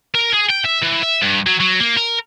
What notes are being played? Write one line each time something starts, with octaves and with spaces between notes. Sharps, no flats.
A#4
G#4
G5
E5
E3
E5
G2
F#3
F#3
A#3
A#4